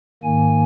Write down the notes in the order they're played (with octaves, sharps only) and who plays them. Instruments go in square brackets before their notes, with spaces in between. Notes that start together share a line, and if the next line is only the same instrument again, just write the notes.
[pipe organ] G#2 D#3 A#3 G#5